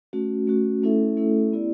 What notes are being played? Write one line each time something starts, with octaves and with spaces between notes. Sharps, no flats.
A3 C#4 F#4
A3 C#4 F#4
A3 C#4 E4 A4 E5
A3 C#4 E4 A4 E5
B3 E4 G4 D5